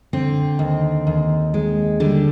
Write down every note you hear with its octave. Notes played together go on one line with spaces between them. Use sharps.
D3 C4
D#2
D#2
G#3
D3 G3 D4